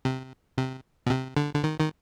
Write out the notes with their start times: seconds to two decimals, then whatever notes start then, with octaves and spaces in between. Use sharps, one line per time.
0.05 C3
0.58 C3
1.06 B2
1.10 C3
1.37 D3
1.54 D3
1.64 D#3
1.80 D#3